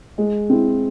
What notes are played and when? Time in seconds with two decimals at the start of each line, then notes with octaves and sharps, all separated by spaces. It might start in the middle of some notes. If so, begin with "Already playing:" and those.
0.18 G#3
0.50 C4 E4 G#4